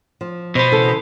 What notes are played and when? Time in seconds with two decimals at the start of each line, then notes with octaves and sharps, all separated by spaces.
0.21 F3
0.55 B2 B3 C5
0.71 C#3 E3 A4